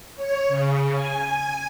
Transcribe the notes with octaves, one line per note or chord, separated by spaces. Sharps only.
C#5
C#3
G#5